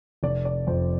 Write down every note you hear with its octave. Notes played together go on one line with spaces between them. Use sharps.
F1 D5
D5
F2 C5